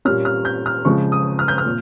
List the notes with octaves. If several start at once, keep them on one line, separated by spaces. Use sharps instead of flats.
A#2 G3 A#3 C#4 F6
F6
G6
F6
C#3 F3 G#3 C#6
D#6
F6
G6
F6
A#2